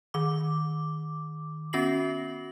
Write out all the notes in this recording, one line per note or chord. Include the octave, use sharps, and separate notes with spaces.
D#3 D6
B3 C#4 F#4 A#6 C7 F#7